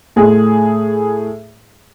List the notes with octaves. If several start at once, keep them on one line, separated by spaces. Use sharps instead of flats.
A2 G#4